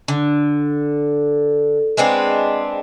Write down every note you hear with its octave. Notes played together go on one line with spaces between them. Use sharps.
D3
G#3 B3 C4 D4